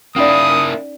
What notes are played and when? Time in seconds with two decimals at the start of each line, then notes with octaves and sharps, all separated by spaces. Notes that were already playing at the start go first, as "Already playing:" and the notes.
0.16 A#3 C#4 D#4 E4 D5 D#6